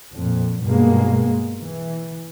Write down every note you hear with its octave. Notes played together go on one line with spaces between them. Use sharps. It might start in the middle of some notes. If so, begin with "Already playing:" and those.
F2 A#2
G2 B2 G#3 A#3
E3